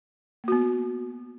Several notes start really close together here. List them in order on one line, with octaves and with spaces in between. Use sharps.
A#3 F#4 B3